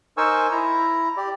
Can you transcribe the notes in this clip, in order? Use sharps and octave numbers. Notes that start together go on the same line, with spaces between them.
D#4 A#4 C5 G#5 C#6 E6
E4 A#5
G4 D5